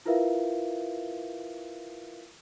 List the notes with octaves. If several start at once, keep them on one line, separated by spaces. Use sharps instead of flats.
E4 F4 A#4 B4 E5 F5